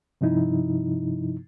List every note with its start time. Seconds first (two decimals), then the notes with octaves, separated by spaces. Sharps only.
0.21 G2 C3 F3 D#4 E4